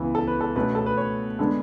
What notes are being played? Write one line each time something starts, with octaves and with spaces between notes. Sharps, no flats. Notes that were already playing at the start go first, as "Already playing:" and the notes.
Already playing: C#2 C#3 E3 B3
A4
B4
A4
B2 A3 C#4 B4
A4
B4
C#5
D3 G#3 B3 A4